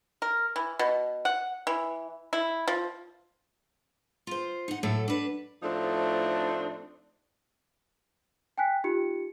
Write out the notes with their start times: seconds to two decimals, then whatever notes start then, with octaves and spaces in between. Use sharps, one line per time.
0.22 A#4
0.56 E3
0.79 B2
1.25 F#5
1.67 E3
2.33 E4
2.68 F3
4.27 F4 C5
4.68 D#4 F#5
4.83 A2 F#3 A3 A4
5.08 D4 B4
5.63 A2 F3 A3 C4 D4 D#4
8.58 G5 G#5 F#6 B6
8.84 D#4 F4 G4 C#7